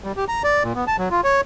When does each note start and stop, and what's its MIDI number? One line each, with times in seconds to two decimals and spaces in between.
0.04 0.12 55
0.17 0.25 67
0.28 0.43 82
0.44 0.63 74
0.63 0.73 46
0.75 0.84 59
0.87 0.96 81
0.99 1.08 54
1.11 1.21 65
1.24 1.41 73